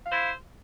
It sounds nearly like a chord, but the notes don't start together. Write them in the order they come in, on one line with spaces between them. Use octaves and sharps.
F5 C5 E4